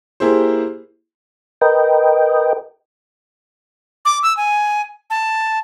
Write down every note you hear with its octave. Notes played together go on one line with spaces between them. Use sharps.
A#3 E4 G4 G#4 C5
A#4 B4 D#5 G5
D6
E6
G#5
A5